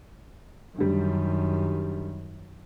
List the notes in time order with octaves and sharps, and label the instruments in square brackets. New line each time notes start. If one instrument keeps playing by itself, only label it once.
[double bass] F#2 D#3 [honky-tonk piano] D3 G3